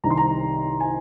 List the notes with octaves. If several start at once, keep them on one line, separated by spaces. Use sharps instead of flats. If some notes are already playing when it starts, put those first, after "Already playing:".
C2 C3 D#3 A#5
C6
A#5
G#5